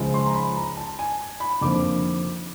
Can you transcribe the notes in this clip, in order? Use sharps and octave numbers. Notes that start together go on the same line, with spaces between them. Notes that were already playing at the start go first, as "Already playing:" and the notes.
Already playing: C#2 C#3 F3 G#3
C6
A#5
B5
A#5
A5
G#5
B5
F2 D3 F3 A#3 D#4 D6